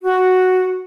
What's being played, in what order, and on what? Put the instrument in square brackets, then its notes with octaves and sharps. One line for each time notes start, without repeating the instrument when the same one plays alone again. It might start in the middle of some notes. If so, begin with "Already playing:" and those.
[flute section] F#4